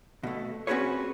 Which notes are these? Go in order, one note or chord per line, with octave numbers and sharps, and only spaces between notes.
B2 A3
C4 C#4 F#4 G#4 B4 C#5